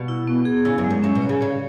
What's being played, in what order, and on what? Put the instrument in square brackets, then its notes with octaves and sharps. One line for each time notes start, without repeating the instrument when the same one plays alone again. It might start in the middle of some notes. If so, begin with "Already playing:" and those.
Already playing: [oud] B2
[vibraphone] E4
B3
G#4
[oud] C#3 [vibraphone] E4
[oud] F#2
[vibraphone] G#3
[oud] F#2
[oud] F#2 [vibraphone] C#4
[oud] B2
[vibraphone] C#5
[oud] C#3
[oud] C#3 [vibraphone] C#5